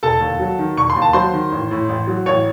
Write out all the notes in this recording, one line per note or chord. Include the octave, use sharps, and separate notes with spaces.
E1 A4 A5
D#2
F#3
D#3
E1 C#6
C6
D#2
A5
F#3 C5 C6
D#3
A1
A2
A1
F#3
A1 C#5 C#6